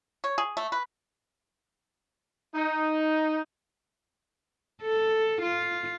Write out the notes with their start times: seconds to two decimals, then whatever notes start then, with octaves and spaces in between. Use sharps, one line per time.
0.24 C#5
0.38 G#4
0.57 A3
0.72 B4
2.55 D#4
4.81 A4
5.41 F4